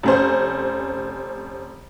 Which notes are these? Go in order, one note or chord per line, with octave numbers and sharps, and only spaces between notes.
F1 C#4 C5